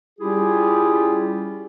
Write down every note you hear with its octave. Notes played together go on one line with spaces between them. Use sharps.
G3 C#4 E4 F4 G4 G#4